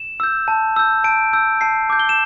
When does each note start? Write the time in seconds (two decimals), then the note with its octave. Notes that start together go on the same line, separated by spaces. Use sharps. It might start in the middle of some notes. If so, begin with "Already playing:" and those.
Already playing: E7
0.20 E6 G6
0.48 A5
0.76 E6 G6
1.04 A5 D7
1.33 E6 G6
1.61 A5 C7
1.90 D6 G6
1.99 G7
2.09 E7